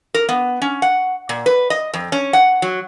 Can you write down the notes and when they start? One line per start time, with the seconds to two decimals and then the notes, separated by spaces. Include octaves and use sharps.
0.14 A#4
0.29 B3
0.62 C#4
0.82 F#5
1.29 A#2
1.46 B4
1.70 D#5
1.94 F2
2.12 C#4
2.33 F#5
2.62 F#3